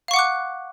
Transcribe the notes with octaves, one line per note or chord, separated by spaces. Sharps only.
F5 F#5 C#6 D6 F#6